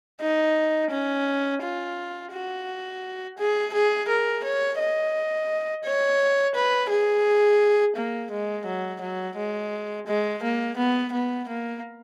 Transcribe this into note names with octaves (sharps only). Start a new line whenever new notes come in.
D#4
C#4
F4
F#4
G#4
G#4
A#4
C#5
D#5
C#5
B4
G#4
A#3
G#3
F#3
F#3
G#3
G#3
A#3
B3
B3
A#3